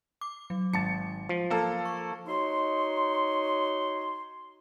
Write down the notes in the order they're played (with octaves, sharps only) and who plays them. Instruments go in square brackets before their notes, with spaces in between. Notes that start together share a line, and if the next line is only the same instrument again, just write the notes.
[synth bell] D6
F#3
[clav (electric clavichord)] G#1 A5 [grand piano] C#7
[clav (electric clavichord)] F3
[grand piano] A#3 A4
[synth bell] C#6
[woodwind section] D#4 F#4 C#5 C6